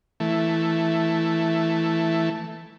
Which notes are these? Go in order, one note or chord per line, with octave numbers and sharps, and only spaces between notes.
E3 A3